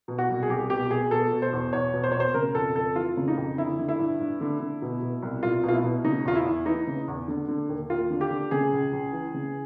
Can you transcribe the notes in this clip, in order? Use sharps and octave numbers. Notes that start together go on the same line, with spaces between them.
B2
F#4
C2
G#4
C2 G4
B2 G4
B2 G#4
B2 A4
B2
C5
E2
E2 C#5
B2
C5
B2 C#5
C5
C#3 A#4
F2 A4
F2 A4
E3 F4
C#3
D#4
F2
D3 E4
D3
E4
G2
G2
D3
D3
B2
B2
C2
C2 F4
B2
F4
E4
B2
C#3 D#4
E2 F4
E4
E2
E3 D#4
C#3
E2
D3
D3
D#2
D#2 F4
D3
G4
D3
C#3 G#4
C#2
C#2
E3
C#3